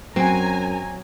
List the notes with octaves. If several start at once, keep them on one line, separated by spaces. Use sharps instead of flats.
F#2 F#3 C4 G#5 A#5